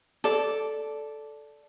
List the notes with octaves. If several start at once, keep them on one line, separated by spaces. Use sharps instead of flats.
A4 D5